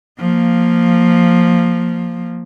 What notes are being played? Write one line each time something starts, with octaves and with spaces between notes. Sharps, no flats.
F3 A#3